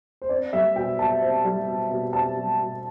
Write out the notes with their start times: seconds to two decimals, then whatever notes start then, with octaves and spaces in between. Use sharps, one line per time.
0.22 C5
0.29 C4 D5
0.53 G3 E5
0.76 B2 G5
0.99 B2 A5
1.22 C4
1.45 G3
1.67 B2
1.91 B2
2.13 C4 A5
2.36 G3
2.60 B2